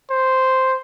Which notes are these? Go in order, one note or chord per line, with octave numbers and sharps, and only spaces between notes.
C5